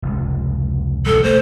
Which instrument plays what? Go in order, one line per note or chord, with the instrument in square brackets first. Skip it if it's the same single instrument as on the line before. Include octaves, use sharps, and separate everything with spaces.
[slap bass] F1 C#2
[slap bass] E1 B1 [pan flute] A4
[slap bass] A3 [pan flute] C5